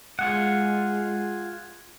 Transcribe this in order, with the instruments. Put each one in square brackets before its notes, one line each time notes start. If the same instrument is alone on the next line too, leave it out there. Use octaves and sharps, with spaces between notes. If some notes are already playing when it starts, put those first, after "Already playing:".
[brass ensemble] G#3 [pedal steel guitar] F4 G#4 F#5